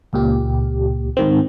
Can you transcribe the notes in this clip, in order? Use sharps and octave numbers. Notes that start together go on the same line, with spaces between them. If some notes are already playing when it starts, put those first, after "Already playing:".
C#2 A#2 G4
G#2 D#3 C4